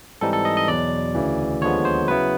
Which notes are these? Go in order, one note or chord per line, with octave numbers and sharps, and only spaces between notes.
G#2 E3 G3 C4 D#4 A4
A4
D#5
D#5
E2 B2 F#3 D5
D2 C#3 E3
D#2 D3 F3 G#3 B3 C#5
C5
C#3 F#3 B3 E4 B4